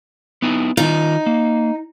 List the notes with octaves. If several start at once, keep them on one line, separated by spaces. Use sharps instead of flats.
B3 D#4 E4
D#3 D#4 F4
A#3